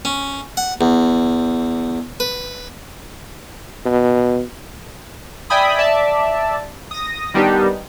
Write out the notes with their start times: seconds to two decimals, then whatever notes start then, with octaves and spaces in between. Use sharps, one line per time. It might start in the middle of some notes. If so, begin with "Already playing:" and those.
0.05 C#4
0.57 F#5
0.81 E2
2.20 B4
3.85 B2
5.50 D5 E5 G5 G#5 B5 D#6
5.78 D5 E5 A5
6.91 D#6 A#6
7.34 D#3 G3 B3 D4 D#4 G4